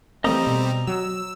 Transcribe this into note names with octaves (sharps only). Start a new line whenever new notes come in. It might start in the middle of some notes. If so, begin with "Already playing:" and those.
E3 G3 A3 A#3 C4 D#5 A#5 D#6
B2
F#3 E6